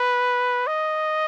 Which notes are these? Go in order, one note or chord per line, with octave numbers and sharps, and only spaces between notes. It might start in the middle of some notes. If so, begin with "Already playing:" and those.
Already playing: B4
D#5